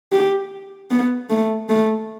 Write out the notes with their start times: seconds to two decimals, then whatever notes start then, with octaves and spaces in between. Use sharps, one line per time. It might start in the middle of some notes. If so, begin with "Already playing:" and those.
0.12 G4
0.91 B3
1.30 A3
1.69 A3